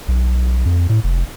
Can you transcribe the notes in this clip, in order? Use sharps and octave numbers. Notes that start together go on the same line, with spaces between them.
B1
F2
A2
F1